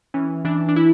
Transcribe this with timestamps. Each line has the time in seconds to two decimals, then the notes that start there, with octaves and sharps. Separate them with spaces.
0.14 E3 C#4
0.45 E3 D4
0.69 D4
0.76 E4